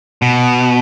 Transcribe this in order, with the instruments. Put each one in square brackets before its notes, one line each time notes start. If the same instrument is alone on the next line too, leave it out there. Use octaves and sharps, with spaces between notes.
[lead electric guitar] B2